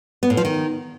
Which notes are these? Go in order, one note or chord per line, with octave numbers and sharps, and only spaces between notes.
B3
A2
F3
D#3